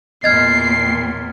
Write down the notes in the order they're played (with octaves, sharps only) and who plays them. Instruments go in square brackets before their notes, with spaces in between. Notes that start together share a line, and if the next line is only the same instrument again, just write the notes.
[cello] E2 A#2 [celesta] D#5 [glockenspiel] F6 G#6 A6 [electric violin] C7